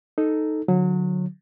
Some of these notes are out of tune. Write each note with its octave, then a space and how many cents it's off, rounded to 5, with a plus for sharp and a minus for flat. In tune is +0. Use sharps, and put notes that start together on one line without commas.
D#4 +0 A4 +0
D3 +0 F#3 -25